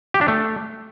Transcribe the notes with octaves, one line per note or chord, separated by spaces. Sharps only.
G4
D4
A3